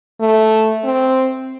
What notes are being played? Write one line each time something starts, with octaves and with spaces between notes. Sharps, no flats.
A3
C4